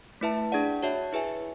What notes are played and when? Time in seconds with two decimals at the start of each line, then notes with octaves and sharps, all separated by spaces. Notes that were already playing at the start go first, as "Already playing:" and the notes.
0.21 A3 E4 B4 E5 A5
0.52 D4 G#4 D5 F#5
0.83 F#4 C#5 E5 A5
1.13 E4 G#4 B4 E5 G#5